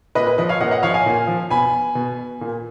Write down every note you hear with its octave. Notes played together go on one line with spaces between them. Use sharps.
A#2 B4 D#5
B4
F3 B4 D#5
C#5 F5
A#2 D#5 F#5
D#5 F#5
F3 C#5 F5
F5 G#5
A#2
F3
B2 G#5 B5
B2
A#2